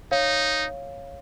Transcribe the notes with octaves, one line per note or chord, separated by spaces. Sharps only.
D#4 C#5 F5